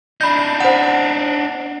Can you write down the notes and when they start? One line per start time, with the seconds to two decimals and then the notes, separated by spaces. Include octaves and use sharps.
0.21 D4 D#4 B5 G6
0.60 C5 F#5